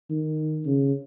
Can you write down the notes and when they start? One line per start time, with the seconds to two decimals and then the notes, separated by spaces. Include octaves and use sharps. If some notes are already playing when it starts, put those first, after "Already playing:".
0.10 D#3
0.66 C#3